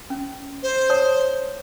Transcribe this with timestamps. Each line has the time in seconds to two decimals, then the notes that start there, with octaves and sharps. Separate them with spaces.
0.10 C#4
0.63 C5
0.90 C#5 A5 D#6